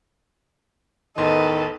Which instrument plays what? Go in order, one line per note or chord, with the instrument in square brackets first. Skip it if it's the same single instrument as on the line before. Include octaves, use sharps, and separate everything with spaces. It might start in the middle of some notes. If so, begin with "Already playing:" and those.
[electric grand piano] A1 E2 C6 [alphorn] D#3 [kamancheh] A4 B4 [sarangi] D#5